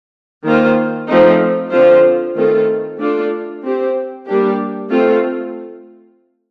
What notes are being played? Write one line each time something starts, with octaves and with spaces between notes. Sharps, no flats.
D#3 A#3 F4 C5
F3 A3 C4 D#4
D3 F3 C4 F4 C5
D#3 A3 C4 F4 A4
A3 D4 F4 A4 D5
C4 G4 C5
G3 A#3 D4 G4
A3 C4 F4 A4